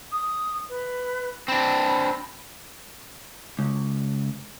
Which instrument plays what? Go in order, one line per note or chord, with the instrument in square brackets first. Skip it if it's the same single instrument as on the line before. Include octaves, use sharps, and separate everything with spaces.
[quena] D#6
B4
[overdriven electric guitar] C4 D4 [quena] B5
[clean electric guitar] C#2